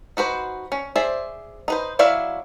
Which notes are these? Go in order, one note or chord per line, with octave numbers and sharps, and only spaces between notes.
D#4 F#4 B4 C5
C#4
G#4 C5 D5 E5
D#4 B4 C5
F#3 E4 D5 E5 F5